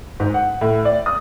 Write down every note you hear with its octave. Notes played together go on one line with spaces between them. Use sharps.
G#2
F#5
A2
D5
D#6